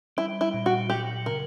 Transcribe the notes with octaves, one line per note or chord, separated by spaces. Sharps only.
G3 E4
E4
A#2
F#4
F#3 G4
C#3 A#4